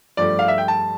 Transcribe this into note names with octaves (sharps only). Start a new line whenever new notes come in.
G2 F3 A3 D5
F5
E5
G5
A5